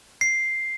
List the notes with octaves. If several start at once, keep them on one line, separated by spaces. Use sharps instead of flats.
C7